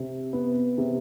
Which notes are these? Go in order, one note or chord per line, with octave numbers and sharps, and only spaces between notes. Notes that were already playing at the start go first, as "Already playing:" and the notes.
Already playing: C3
B3
C3